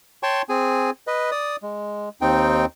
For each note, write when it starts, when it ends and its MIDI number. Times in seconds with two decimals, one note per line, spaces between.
0.23 0.42 73
0.23 0.42 79
0.23 0.42 81
0.23 0.42 84
0.23 0.42 85
0.49 0.91 60
0.49 0.91 68
0.49 0.91 80
1.07 1.30 71
1.07 1.30 75
1.32 1.56 74
1.32 1.56 87
1.63 2.09 56
2.21 2.65 39
2.21 2.65 60
2.21 2.65 63
2.21 2.65 79